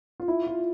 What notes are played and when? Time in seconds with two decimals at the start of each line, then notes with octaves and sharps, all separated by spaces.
0.20 F4
0.28 E4
0.47 F4